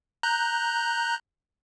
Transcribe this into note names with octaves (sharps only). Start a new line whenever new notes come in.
A#5 F#6 G6